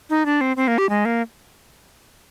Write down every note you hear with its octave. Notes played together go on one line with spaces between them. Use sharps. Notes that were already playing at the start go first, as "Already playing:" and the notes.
D#4
D4
C4
C4
A#3
G4
G#3
A#3